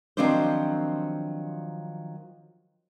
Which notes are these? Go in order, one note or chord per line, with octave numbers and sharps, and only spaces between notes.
D#3 F3 F#3 C4 D4 C5